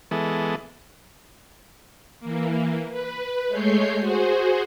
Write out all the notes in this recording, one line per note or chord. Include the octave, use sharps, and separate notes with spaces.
E3 G#3 B3 A4
E3 A#3
B4
G#3 A3 C#5 G6 C7
F#4 G#4 C5